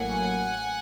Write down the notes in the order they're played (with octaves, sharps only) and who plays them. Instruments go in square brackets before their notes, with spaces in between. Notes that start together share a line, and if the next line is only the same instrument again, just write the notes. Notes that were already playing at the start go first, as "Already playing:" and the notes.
Already playing: [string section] A1 A2 F#3 A#3 C#4 F#5 G#5